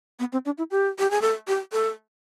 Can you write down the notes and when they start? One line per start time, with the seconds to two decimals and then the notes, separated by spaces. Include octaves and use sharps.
0.19 B3
0.33 C4
0.46 D4
0.58 E4
0.71 G4
0.99 G4
1.11 G#4
1.22 A4
1.48 G4
1.73 A4